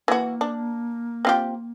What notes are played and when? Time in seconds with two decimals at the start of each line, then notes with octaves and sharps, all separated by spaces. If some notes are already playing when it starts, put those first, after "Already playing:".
0.08 E3 A#3 F#4
0.41 D4
1.25 C4 F4 G4